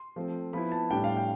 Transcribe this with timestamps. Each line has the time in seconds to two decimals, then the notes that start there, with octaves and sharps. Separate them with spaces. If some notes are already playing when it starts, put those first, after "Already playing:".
Already playing: C6
0.16 F3 A3 C4
0.53 F3 B3 E4 B5
0.72 A5
0.91 A2 G3 D4 G5
1.04 F5
1.17 G5